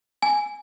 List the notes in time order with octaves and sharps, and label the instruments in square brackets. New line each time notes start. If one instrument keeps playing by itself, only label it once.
[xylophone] G#5